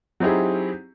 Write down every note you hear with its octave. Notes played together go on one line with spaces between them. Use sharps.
F#3 C4 D#4 E4 G4 G#4